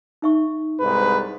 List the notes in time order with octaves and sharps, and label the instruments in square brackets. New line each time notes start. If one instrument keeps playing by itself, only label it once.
[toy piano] D#4 E5 C#6
[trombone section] C2 G#2 B4